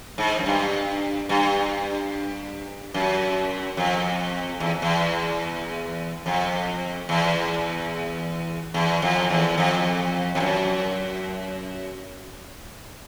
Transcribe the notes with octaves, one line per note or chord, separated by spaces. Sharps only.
G#2
F#2
G2
G2
F#2
F2
E2
E2
F2
E2
E2
F2
E2
F2
F2
F#2